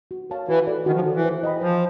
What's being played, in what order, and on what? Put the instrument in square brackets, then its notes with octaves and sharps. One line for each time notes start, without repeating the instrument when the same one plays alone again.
[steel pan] F#4
A#4 C#5 F5 A5
[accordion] E3 [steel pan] F#4
[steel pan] A4 D5
[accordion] D#3 [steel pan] F#4
[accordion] F3
[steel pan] A4 D5
[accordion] E3
[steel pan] C5
D#5 G5 B5
[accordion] F3 [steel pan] C5